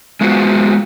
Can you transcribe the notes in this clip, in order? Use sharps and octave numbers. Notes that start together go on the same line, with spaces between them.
G#3 B3 F4 F#4 C5